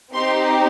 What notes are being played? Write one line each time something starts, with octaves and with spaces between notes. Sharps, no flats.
C4 D#4 G4 C6